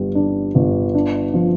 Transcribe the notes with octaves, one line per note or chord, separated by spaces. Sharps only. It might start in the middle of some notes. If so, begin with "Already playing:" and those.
Already playing: G1 G3
D4
G1
D4
F3